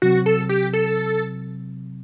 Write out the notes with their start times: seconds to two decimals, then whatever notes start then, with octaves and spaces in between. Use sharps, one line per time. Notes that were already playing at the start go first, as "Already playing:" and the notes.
0.02 C3 F#3 C4 F#4
0.26 A4
0.49 G4
0.73 A4